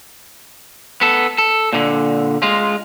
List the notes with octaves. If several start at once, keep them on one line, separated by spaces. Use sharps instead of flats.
B3 A4
A4
A#2 D3
G#3 F4